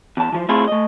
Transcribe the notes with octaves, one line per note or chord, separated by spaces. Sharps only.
E2 A5
E3 F3 C5
A3 C4 E4 F4 G#4 A4
A3 D#5